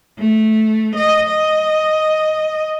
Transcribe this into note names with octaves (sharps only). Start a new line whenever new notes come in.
A3
D#5
D#5